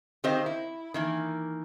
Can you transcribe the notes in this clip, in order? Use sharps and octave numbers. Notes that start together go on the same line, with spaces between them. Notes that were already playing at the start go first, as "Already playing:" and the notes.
D#3 C4 G4 C5 D#5 F5
E4
D#3 E3 A#3